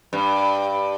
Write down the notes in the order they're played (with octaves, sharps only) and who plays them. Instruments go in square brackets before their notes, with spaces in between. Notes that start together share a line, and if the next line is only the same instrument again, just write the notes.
[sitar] G2